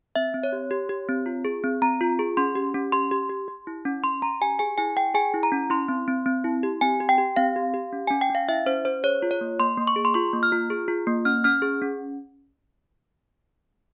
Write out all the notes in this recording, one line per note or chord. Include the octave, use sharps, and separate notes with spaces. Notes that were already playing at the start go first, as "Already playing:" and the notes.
C4 E5
C4
C#5
G4
G4
G4
C4
F4
G#4
C4
C4 A#5
F4
G#4
C#4 C6
G4
C#4
G4 C6
G4
G4
G4
E4
C#4
C#4 C6
C#4 A#5
G4 G#5
G#4 G#5
E4 G#5
G#4 G5
G#4 G#5
E4
A#5
C#4
E4 C6
C4
C4
C4
E4
G4
C4 G#5
G4
G5
G4
C4 F5
G4
G4
C#4
C#4 G#5
G5
C#4 F5
E4 E5
C#4 C5
C#4 C5
G#4 C#5
F4
C#5
A#3
A#3 C6
A#3
C#6
G#4
C6
F4 C#6
A#3
F6
F4
G#4
F4
A#3
C#4 F6
C#4 F6
G#4
C#4